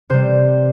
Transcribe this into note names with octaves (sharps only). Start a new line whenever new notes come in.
C3 G3 C5